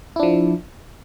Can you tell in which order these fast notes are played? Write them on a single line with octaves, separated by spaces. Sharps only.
E4 D4 F3